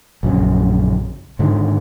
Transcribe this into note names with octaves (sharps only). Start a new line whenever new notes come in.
A#1 F#2 C#3
G#2 D3 D#3